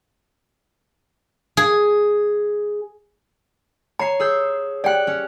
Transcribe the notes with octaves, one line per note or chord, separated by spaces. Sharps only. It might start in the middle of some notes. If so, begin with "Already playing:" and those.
G#4
C#5 A#5 C7
G#4 E6 G6
G4 D5 G5 F#6
C#4